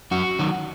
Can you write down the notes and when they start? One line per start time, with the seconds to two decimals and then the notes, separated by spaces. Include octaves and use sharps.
0.11 F#2 F#4
0.39 D#3 F#3